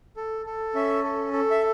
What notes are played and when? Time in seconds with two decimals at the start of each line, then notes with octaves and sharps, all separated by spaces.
0.17 A4
0.46 A4
0.75 C#4 E5
1.04 A4
1.33 A4
1.51 E5